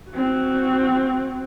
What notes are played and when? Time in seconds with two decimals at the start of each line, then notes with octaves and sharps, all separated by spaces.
0.11 C4 F#4